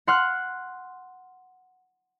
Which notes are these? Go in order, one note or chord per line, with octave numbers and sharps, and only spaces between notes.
F#5 C6 F6 F#6